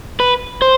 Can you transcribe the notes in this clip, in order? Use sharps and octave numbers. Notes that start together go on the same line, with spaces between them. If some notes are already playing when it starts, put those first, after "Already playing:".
B4
C5